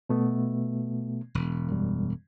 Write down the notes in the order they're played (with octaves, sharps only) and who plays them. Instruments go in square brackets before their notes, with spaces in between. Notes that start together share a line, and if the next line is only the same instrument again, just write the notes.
[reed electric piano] B2 A3 B3
[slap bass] E1
[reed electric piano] F#2 G3